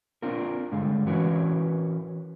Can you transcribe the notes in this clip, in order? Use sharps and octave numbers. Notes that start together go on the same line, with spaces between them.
C4 D4 F4 A#4
G2 D3 G#3 F5
E3 C#4 F#4 A#4 B4 C#5